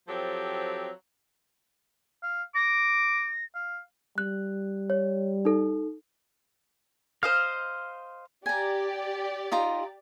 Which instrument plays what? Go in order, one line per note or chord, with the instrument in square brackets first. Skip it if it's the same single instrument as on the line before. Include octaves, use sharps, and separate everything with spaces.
[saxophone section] F3 F#3 C4 G4 A4
[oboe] F5
[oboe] D6 [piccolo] A#6
[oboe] F5
[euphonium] G3 [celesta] F#6
[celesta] C#5
D#4 A4
[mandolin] C5 D#5 F5 [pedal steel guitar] F6
[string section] G4 D5 [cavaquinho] G#5 A#5
[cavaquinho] D#4 F4 A#5